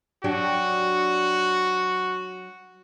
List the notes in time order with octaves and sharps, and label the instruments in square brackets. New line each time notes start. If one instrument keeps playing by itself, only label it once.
[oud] F#3 D4 G4 [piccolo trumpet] F#4